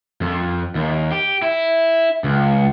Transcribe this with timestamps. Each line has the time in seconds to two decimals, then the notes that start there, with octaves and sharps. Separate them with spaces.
0.21 F2
0.75 D#2
1.11 G4
1.42 E4
2.24 C#2